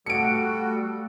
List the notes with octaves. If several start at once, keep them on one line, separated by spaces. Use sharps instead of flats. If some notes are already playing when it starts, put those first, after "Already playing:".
G3 A3 F#4 A4 F5 C#7 D7